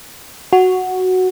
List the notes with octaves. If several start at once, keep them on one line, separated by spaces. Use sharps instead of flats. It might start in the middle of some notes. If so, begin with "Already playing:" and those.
F#4